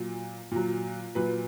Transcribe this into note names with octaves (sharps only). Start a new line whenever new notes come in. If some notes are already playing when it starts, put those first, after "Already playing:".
Already playing: A#2 F#3
A#2 F#3
A#2 F#3 B4